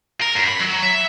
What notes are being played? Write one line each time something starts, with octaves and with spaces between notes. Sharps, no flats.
A#4
F#2
B5
F#3
E5